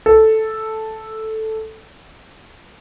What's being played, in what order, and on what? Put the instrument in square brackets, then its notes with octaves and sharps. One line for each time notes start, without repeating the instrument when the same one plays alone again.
[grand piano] A4